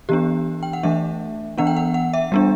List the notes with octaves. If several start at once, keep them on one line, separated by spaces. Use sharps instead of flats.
E3 B3 D4 G4
G5
F#5
E3 A3 D4 E5
E3 B3 D4 F#5
G5
F#5
F#5
E5
G3 B3 D4